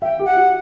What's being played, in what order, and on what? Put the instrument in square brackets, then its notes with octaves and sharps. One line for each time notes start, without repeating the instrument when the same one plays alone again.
[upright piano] E5 [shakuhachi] G5
[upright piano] G4
[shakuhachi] F#5
[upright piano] F#4